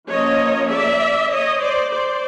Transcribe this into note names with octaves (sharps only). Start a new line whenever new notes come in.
F3 A#3 C#4 C#5 D#5
D5 E5
C#5 D#5
C5 D5
C5 D5